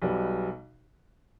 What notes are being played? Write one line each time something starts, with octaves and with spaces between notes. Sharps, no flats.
B1 B2 G3 B3